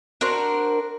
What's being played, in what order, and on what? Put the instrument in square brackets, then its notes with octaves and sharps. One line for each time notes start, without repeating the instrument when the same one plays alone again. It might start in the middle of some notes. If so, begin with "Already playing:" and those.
[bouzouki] D4 F#4 A#4 C5